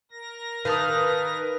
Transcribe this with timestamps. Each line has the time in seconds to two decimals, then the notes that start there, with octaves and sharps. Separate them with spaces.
0.11 A#4 A#6
0.65 D#3 B4 F5 G5 A5 D#6